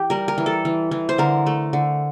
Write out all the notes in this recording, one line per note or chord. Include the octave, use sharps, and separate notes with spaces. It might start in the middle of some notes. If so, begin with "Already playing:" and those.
Already playing: E3 G4
G3 A#4
A#4
E3
A4
E3
E3
C5
D3 A#4
A3
D3